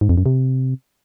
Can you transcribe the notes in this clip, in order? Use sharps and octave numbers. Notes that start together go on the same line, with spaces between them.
G#2
F2
F#2
C3